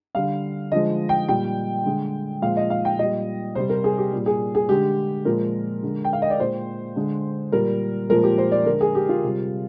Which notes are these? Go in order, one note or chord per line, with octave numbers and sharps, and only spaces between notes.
D3 G3 F5
D3 F3 G#3 D#5
G5
A#2 G3 G5
D3 G#3
A#2 F3 G#3 F5
D#5
F5
G5
A#2 G3 D#5
C3 G3 C5
A#4
G#4
G4
A#2 G3
G#4
G#4
D3 G#3 G4
A#2 F3 G#3 A#4
D3 G#3
G5
F5
D#5
D5
A#2 G#3 C5
D3 G#3
A#2 G3 A#4
A#2 F3 G#3 A#4
G4
C5
D5
D3 G#3 A#4
G#4
G4
F4
C3 G3